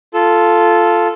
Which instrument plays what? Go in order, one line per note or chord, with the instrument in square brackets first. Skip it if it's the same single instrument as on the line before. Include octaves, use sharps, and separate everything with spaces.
[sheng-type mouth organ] F4 A4